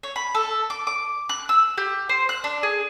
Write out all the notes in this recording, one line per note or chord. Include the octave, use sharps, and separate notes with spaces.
C#5
B5
A4
D6
D6
F#6
E6
G4
C5
F#6
D4
G#4